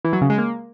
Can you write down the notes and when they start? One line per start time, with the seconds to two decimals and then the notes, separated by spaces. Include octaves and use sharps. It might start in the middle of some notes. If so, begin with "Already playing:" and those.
0.04 E3
0.13 F#3
0.21 C#3
0.30 G#3
0.38 A#3